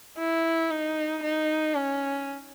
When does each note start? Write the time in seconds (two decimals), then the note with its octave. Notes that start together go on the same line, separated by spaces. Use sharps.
0.18 E4
0.70 D#4
1.23 D#4
1.74 C#4